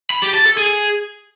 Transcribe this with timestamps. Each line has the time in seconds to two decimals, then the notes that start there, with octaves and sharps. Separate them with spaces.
0.10 B5
0.22 G4
0.34 A5
0.46 A4
0.57 G#4